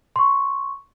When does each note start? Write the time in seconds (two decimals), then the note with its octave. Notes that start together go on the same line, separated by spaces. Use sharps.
0.16 C6 C#6